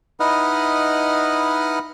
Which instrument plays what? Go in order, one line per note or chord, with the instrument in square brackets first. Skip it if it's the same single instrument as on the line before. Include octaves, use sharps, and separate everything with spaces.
[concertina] D#4 E4 B4 D#5 F#5 F6